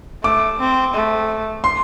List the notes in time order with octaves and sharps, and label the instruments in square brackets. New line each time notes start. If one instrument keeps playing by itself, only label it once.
[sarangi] A3 [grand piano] D6
[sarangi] C4
A3
[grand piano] C6